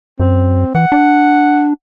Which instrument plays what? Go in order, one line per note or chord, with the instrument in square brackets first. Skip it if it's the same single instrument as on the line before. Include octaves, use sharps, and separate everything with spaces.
[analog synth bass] F#2 [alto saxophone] C4
[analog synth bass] E3 [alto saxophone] F#5
[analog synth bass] D4